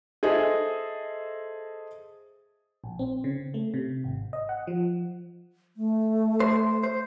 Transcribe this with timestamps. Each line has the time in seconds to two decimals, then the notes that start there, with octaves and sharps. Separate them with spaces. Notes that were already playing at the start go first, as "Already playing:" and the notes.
0.23 G#4 A4 C5 D#5 E5
2.84 A#1
2.99 C4
3.24 C#3
3.54 A3
3.74 C3
4.04 G#1
4.33 D#5
4.49 F#5
4.67 F3
5.76 A3
6.40 C5
6.83 C5